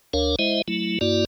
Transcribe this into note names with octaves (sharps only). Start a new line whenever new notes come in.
D2 D4 A#4 C#5 F5
G#3 E4 C5 D#5 E5
F#3 A3 E4
G2 A#3 E4 F#4 D5